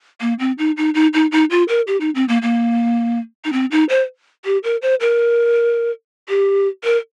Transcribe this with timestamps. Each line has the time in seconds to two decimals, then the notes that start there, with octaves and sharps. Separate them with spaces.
0.21 A#3
0.39 C4
0.58 D#4
0.77 D#4
0.95 D#4
1.14 D#4
1.32 D#4
1.51 F4
1.68 A#4
1.87 G4
2.01 D#4
2.15 C4
2.28 A#3
2.42 A#3
3.45 D#4
3.53 C4
3.71 D#4
3.89 C5
4.45 G4
4.64 A#4
4.82 C5
5.01 A#4
6.29 G4
6.84 A#4